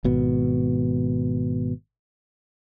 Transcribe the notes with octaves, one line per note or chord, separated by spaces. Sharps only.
G#1 B2